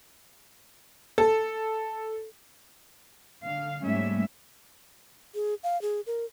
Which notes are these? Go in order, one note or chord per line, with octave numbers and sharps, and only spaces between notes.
A4
D3 F5
G#2 G3 A3 A#3 C#4 E5
G#4
F5
G#4
A#4